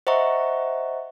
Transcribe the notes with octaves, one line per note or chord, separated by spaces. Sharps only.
C5 D#5 E5 F#5 A#5 C#6